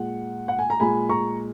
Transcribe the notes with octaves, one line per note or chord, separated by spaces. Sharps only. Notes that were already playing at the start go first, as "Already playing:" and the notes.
Already playing: A#2 G#3 F#5
F#5
G#5
A#5
A#2 G#3 G#5 B5
A#5 C#6